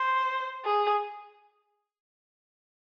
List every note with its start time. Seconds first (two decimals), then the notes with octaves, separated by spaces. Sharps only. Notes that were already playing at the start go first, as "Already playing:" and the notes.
Already playing: C5
0.65 G#4